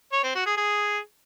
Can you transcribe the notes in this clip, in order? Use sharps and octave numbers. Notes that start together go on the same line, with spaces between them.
C#5
C4
F#4
G#4
G#4